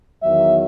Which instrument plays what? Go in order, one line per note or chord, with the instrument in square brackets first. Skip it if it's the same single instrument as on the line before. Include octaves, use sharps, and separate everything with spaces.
[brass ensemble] E2 D#3 F#3 E5